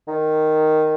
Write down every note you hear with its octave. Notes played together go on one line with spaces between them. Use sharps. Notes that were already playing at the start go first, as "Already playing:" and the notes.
D#3